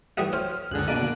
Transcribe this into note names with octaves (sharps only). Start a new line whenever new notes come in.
E3 G3 A3 F#4 D#6
C5 C#5 F6
C#2 F#2 D3 G#4 F#6
B2 A#3 D5 D#5 G#5 D7